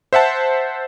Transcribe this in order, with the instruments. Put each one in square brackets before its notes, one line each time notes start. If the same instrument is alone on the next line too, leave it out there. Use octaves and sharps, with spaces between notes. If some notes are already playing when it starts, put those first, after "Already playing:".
[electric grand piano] C5 E5 F#5 A5